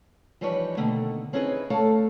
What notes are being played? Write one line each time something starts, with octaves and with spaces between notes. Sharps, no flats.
E3 F3 G3 D#4 B4 C#5
B2 D3 D#3 A3 A#3
C4 C#4 D#4 E4 G#4 B4
D2 A3 A4 C#5 F5 A#5